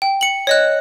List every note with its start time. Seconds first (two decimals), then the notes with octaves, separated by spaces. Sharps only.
0.02 G5
0.21 C#7 F#7
0.47 C#5 D#5 F#6